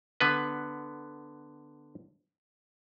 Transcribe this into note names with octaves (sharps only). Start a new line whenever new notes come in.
D3 B3 B4